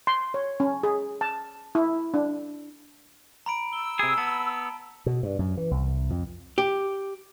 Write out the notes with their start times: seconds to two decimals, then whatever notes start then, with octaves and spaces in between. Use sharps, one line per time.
0.07 C6
0.34 C#5
0.60 C#4
0.83 G#4
1.21 A5
1.75 E4
2.14 D4
3.46 A#5 B5 D7
3.73 E6 G7
3.99 C3 G#4
4.18 B3 A5
5.06 B2
5.23 G2
5.39 F#2
5.57 E3
5.71 C2
6.10 F2
6.58 G4